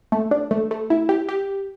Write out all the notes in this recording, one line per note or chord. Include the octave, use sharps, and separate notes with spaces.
A3
D4
A3
A3
E4
G4
G4